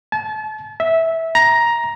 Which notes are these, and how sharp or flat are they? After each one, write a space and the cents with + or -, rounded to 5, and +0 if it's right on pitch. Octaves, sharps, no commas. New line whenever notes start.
A5 -35
E5 -15
A#5 +10